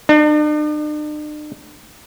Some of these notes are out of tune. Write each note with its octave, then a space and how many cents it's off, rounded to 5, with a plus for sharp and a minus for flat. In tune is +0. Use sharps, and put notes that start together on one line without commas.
D4 +45